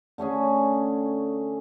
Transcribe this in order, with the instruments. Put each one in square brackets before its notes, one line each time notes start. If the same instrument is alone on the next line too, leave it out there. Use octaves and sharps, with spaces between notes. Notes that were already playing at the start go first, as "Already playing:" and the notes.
[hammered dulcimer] D3 A3 C#4 G#4